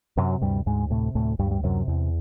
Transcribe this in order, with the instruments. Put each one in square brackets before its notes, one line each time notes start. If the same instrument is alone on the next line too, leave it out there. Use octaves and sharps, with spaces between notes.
[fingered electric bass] F#2 C3 F#3
D2 G2 G3
D2 G#2 G#3
A2 C3 A3
D2 A2 A3
D2 G2 G3
G3
F#2 C3 F#3
E2